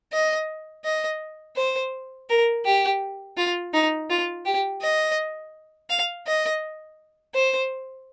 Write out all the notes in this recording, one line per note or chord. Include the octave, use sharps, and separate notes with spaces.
D#5
D#5
C5
A#4
G4
F4
D#4
F4
G4
D#5
F5
D#5
C5